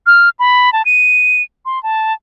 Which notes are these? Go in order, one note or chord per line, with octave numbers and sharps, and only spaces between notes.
F6
B5
A5
D#7
C6
A5